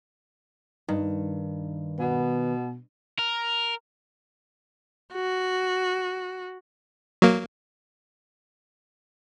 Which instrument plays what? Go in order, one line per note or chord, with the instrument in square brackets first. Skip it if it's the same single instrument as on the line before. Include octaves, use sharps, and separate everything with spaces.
[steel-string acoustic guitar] G2 [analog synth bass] D#3
[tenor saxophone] B2 [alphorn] B3
[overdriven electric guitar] A#4
[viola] F#4
[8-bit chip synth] F#3 A#3